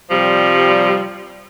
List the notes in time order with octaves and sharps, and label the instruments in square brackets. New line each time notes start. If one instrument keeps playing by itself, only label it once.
[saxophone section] C3 F3 G3